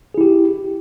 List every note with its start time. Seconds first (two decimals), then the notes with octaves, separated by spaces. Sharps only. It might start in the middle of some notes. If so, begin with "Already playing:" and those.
0.14 G#4
0.18 E4
0.21 G4